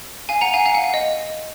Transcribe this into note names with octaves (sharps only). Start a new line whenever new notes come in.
F5 G#5
F#5 A#5
F5 G#5
F5 G#5
F#5
F5
D#5